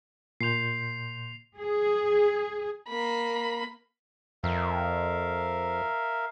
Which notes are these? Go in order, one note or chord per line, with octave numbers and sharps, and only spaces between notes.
A#2 C6 G6 C7 F7
G#4
A#3 B5
F2 A#4 E5 F5